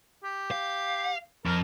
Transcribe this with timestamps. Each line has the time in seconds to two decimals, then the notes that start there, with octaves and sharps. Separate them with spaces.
0.24 G4
0.51 F5
1.46 F2 A#4